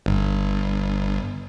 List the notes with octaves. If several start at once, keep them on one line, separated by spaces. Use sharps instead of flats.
G1